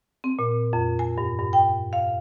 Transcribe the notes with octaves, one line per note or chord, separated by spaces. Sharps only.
C4
A#2
F2
G#5
G2
G2
G5
F5